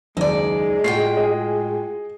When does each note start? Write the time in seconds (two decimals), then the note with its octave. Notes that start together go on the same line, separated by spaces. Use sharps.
0.17 F#1 D#2 G#3 D#4 D5
0.84 A2 F4 F#4 G5 C7
1.17 G#4 D#5